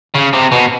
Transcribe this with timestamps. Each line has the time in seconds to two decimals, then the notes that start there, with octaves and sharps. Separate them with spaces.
0.15 C#3
0.33 C3
0.52 B2